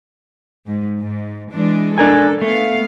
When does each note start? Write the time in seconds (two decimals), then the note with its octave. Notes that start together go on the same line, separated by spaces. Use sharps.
0.67 G#2
0.98 G#2
1.52 E3 G#3 D4
1.98 D4 A4 A#4 G#5
2.41 A3 B3 F5